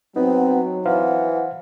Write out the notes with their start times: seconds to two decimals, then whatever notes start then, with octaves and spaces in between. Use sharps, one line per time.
0.16 F#3 B3 C4 D#4
0.86 E3 C5 F5 F#5